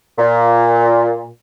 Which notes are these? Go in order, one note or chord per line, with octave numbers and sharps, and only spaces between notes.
A#2